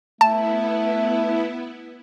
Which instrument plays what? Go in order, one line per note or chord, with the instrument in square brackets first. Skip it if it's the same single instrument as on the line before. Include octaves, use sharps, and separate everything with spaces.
[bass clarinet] A3 [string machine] B3 E4 [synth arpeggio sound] A5